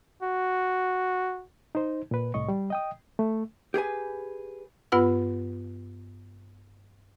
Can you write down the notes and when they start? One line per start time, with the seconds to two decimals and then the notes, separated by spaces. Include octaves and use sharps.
0.23 F#4
1.75 D#4 C5
2.11 A#2 B4
2.34 C2 A2 D#5 C#6
2.48 G3
2.70 D#5 G5 D#6
3.19 A3
3.74 G4 G#4 B4 G#5
4.92 G2 B3 F4 B4 F#5 E6